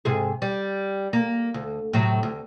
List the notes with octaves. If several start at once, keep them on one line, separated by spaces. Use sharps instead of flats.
G#2 C3 G#4
G3
A#3
D2
A2 C3 F#3
D2